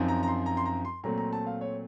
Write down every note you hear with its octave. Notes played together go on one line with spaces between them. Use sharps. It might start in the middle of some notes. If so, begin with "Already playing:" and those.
Already playing: F#2 F3 C4 D#4
A#5
A#5
C6
A#5
C6
A#5
C6
A#2 F#3 A3 C4 A#5
A#5
A5
F5
C#5